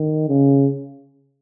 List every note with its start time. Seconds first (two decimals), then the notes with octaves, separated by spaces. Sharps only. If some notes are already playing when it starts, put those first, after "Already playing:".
Already playing: D#3
0.28 C#3